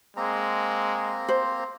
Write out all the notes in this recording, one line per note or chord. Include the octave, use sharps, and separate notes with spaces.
G#3 A#3 C4 A#5
C5